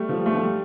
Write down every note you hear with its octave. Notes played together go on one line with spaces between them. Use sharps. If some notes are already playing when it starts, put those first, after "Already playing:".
Already playing: G3 A3
F3
G3
A3
F3
G3